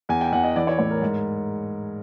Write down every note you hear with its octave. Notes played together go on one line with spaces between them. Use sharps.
E2 G#5
G5
E2 F#5
D#5
E3 D5
C#5
A2 C#5
A#4
G#2